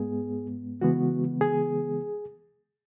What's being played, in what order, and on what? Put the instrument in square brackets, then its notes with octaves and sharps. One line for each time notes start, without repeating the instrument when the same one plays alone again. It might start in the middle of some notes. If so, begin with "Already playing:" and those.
Already playing: [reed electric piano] G#2 G#3 B3 G#4
C#3 E3 G#3 B3 F#4
G#4